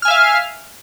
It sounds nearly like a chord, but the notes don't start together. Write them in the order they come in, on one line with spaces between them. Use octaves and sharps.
F6 G#5 E5 F5